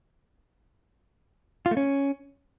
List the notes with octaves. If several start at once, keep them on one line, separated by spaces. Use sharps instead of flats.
F4
A3
C#4